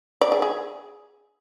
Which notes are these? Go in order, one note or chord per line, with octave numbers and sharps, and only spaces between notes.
D5
G#4
G#4